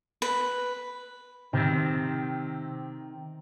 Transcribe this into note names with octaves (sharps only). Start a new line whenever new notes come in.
B4
C3 D#3 C4